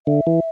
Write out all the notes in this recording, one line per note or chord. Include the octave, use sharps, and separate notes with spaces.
D3 E5
E3